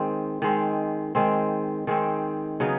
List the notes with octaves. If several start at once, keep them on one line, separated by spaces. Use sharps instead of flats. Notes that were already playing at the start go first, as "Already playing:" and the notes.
Already playing: D#3 G#3 C4
D#3 G#3 C4
D#3 G#3 C4
D#3 G#3 C4
C#3 F#3 B3 D#4